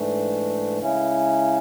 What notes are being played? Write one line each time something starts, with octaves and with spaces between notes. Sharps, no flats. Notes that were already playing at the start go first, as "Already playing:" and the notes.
Already playing: G#2 E3 A3 D4
C#3 G#3 C#4 E4